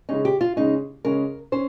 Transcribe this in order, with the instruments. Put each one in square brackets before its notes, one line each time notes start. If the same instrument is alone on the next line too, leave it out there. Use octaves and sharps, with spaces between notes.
[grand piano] C#3 G#3 C#4 [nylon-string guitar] D#4
[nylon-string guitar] G4
F4
[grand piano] C#3 G#3 C#4 [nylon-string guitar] D#4
[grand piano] C#3 G#3 C#4 [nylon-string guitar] A#4
[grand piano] C#4 [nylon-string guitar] C5